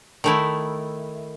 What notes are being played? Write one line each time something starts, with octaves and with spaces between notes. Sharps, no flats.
D#3 A3 E4